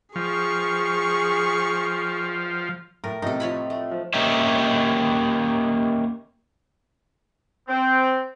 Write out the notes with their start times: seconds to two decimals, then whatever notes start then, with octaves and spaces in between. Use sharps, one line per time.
0.16 F3 G#4 C#6
3.04 A2 A#4
3.22 A2 C3 D#4 A4
3.40 F3 C#5 B5
3.70 A3
3.91 F3
4.14 A#3 C#4 D#4 G4 E5
7.69 C4